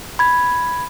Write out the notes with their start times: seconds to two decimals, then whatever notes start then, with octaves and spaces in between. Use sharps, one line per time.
0.19 B5 G#6